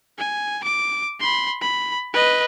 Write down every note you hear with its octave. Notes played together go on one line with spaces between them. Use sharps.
G#5
D6
B5 C6
B5
B4 D#5